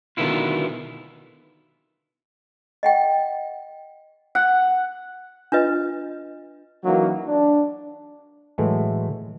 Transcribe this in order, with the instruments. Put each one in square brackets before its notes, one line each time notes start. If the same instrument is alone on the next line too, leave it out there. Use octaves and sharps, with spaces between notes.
[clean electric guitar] B2 D3 D#3 B3 E4 F4
[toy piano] D#5 F#5 G5
[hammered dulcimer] F#5
[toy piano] D4 F4 B4 D#5
[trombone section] E3 F#3 A#3 C#4 D#4 F#4
D4
[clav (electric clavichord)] A2 E3 F#3 G#3 A3